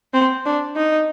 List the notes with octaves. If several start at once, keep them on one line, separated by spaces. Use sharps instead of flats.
C4
D4
D#4